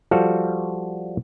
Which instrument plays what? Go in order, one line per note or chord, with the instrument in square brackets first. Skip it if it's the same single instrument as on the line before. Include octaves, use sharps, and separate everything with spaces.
[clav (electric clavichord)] F3 G3 F#4 A4 F5